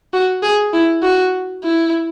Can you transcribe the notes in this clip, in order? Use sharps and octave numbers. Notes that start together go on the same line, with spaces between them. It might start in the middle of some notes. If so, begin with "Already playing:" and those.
F#4
G#4
E4
F#4
E4